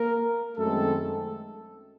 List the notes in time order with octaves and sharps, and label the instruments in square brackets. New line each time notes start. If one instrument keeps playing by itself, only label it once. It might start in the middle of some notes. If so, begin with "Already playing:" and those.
Already playing: [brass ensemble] A#3 A#4
F#2 D#3 G#3 A3 C4 A4